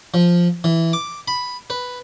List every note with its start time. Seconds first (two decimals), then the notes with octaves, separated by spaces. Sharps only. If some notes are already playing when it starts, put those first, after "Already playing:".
0.14 F3
0.64 E3
0.93 D6
1.28 B5
1.70 B4